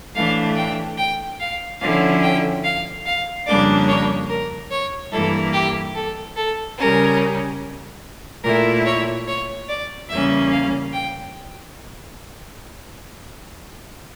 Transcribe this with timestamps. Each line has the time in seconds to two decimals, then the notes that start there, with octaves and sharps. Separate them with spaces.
0.15 A2 E3 A3 D4 F5
0.56 G5
0.97 G5
1.39 F5
1.80 D3 F3 C#4 E4 F5
2.22 G5
2.64 F5
3.05 F5
3.46 F2 C#3 G3 A#3 D4 D5
3.88 C#5
4.30 A#4
4.70 C#5
5.11 G2 E3 A#3 E4 A4
5.53 G4
5.95 A4
6.36 A4
6.78 C#3 G3 C#4 A#4
8.43 A#2 A3 E4 A#4
8.85 C#5
9.27 C#5
9.68 D5
10.09 E2 C#3 G3 A#3 C#4 E5
10.51 F5
10.92 G5